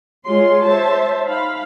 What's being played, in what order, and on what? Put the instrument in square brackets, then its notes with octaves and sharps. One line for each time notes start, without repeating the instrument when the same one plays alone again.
[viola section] G#3 F4 C6 [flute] C#5
[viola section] C5 E5 A5
[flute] D#4 [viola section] F5 B5